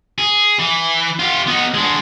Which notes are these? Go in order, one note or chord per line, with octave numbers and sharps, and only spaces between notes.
G#4
E3
F4 G4
B3 D#4
G#3 D4